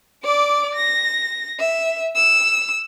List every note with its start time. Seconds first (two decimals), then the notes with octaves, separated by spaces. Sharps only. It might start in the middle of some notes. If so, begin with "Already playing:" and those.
0.24 D5 D6
0.75 A#6
1.59 E5
2.16 E6